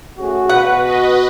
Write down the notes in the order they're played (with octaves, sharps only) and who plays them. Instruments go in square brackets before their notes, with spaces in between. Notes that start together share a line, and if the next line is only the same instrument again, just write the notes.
[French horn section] A3 C#4 G#4 [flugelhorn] F#4
[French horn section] B2 [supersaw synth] B4 [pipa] F#5
[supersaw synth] B4 D#5